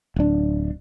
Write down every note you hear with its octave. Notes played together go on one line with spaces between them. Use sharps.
D1 D4